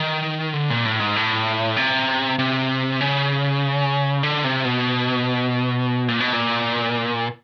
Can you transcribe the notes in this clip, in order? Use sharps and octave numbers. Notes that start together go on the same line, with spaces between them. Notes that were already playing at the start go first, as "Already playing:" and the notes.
Already playing: D#3
D3
A#2
A2
G#2
A2
C3
C3
C#3
D3
C3
B2
A#2
B2
A#2